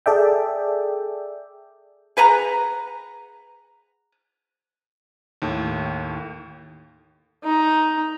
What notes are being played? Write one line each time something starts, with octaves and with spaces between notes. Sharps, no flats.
G#4 A4 D5 E5 G5
G#4 B4 F#5 A#5
D#2 A2
D#4 A#5